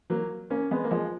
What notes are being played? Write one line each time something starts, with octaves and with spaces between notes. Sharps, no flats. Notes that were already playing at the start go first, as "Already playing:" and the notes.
F#3 A#3
A#3 C#4
G#3 B3
A#3
F3 G#3